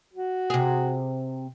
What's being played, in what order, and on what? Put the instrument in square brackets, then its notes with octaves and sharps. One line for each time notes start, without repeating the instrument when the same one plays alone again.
[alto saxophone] F#4
[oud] C3 G#4